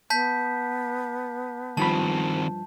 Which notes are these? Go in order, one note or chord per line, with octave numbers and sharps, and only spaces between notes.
B3 A5 G6 B6
G2 D#3 F3 C4 A5 B5